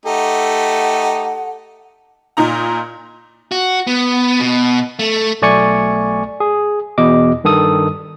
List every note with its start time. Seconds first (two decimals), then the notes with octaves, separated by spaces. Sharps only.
0.06 A3 D#4 G4 A4 F#5
2.37 A#2 D#4 A#5
3.52 F#4
3.87 B3
4.41 B2
4.99 A3
5.42 B1 A3 D5 G#5 C#6 C#7
6.40 G#4
6.98 E2 B2 D#5 D6
7.44 G2 D#3 A4 D#6